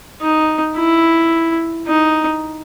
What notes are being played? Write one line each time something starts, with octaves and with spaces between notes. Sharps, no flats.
D#4
E4
D#4